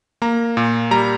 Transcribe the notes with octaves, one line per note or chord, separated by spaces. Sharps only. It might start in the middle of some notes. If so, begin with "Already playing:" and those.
A#3 A#5
A#2
G3 A#5